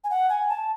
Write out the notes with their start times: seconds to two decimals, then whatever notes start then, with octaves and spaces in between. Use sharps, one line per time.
0.04 G#5
0.10 F#5
0.29 G#5
0.49 A5